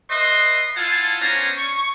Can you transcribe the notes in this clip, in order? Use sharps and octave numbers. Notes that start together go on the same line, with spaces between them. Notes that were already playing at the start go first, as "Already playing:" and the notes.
B4 D#5 E5 C6
E4 F4 F#5 G#5 A5
B3 C#4 D4 C5 G#5 A#5
C#6